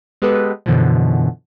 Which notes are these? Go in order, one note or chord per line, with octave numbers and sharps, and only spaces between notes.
G#3 B3 G4 A4 B4
F#2 B2 D3 E3 F3